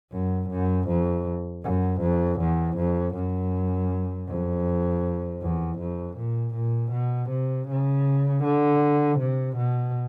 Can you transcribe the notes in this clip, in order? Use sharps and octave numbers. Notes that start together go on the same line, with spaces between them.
F#2
F#2
F2
F#2
F2
E2
F2
F#2
F2
E2
F2
A#2
A#2
B2
C3
C#3
D3
C3
B2